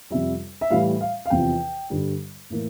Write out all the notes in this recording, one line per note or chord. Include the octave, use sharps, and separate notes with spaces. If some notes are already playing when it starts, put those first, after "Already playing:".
F2 C3 G3 E5
E5
A2 E3 G3 F5
F5
F5
E2 C3 F3 G5
G2 D3 G3
A2 E3 A#3